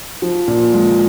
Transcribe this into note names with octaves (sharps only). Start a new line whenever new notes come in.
F3
A#2
G#3